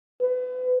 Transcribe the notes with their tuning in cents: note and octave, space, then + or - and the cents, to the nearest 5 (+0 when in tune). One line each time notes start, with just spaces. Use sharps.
B4 +35